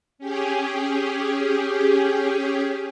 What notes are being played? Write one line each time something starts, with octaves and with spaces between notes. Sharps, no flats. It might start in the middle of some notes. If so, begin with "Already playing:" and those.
C#4 G4 G#4